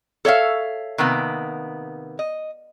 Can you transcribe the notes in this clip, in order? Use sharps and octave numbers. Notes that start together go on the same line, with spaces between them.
A4 C#5 E5 F5
C3 D#3 A#3 B3
D#5